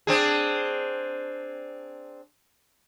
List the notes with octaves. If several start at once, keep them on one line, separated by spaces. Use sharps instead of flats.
C4 D4 G#4